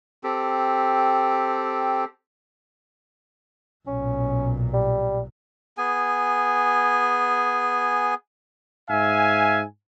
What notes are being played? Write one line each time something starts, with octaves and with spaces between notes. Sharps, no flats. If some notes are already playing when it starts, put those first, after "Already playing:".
C4 G4 A4
B1 A#2 C#4
G3
B3 G#4 G#5
G#2 E5 F5 G#5